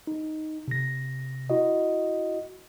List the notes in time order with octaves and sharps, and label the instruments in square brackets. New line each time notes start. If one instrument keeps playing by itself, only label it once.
[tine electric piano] D#4
C3 A#6
E4 F#4 D#5